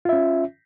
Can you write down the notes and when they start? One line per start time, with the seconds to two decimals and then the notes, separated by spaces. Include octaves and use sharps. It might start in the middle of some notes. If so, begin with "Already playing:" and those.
0.05 F4
0.09 E5
0.13 C#4